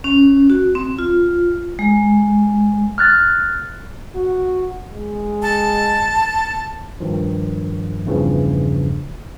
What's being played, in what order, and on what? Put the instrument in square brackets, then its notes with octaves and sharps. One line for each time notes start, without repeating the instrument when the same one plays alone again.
[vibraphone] C#4
F#4
C4
F4
G#3
[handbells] F6 F#6 A6
[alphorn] F#4
G#3
[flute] A5
[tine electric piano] G2 D#3 F3
E2 G2 C#3 E3 F3